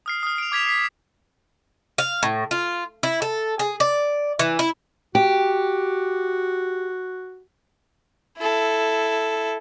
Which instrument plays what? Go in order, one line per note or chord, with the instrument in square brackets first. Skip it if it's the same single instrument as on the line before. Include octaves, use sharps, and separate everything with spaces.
[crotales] D#6 F6 C7
D#6 F6
D7 F7
D6 G#6 B6 F7
B6 C7
[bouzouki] F5
A2
F4
E4
A4
G#4
D5
E3
E4
[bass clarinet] F#4 [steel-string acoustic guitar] G4
[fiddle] E4 A4